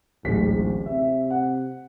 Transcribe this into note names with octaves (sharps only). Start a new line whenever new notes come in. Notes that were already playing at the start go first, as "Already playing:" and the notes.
D1 A1 G#2 B6
C3 E5
F#5